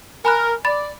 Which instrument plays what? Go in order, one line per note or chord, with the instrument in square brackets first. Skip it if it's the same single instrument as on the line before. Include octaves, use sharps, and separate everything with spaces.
[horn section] A#4 [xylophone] G#5 B5 F#6
[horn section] D5 [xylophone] B5 A6